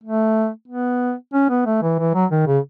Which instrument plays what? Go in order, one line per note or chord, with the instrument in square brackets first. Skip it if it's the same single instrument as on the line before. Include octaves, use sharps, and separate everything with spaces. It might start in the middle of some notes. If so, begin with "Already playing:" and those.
[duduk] A3
B3
C#4
B3
A3
E3
E3
F#3
D#3
C#3